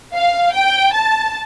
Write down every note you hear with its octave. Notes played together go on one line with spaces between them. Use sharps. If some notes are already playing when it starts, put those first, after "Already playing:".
F5
G5
A5